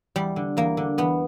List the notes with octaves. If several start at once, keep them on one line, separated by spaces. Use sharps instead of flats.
E2 G3
D3
E2 A#3
D3
E2 B3